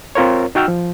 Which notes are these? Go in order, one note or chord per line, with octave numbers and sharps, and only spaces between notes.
C4 F4 A#4 C#5
D#4 F#4 G5 E6 F6
F3